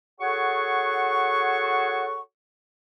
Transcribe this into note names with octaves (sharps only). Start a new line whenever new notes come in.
F#4 G#4 A4 C#5 F#5 C#6